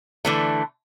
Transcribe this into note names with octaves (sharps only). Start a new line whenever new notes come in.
D3 E3 A3